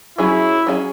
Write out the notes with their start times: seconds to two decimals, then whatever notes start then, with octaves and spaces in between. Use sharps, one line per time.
0.18 F#3 C#4 E4 G#4
0.67 F#3 C#4 G#4